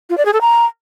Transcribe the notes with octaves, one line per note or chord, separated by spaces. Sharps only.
F4
D5
G#4
A4
A#5